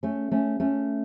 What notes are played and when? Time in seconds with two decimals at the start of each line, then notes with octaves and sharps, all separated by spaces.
0.03 A3 C#4
0.31 A3 C#4
0.60 A3 C#4